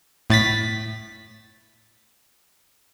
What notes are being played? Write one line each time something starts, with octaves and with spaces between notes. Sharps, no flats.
A2 A6 B6